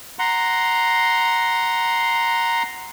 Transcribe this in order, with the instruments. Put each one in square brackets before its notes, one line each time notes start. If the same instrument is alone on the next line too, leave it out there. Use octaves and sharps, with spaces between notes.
[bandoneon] F#5 A#5 C6